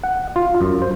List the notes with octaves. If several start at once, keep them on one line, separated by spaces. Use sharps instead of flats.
F#5
F4
F#2
C5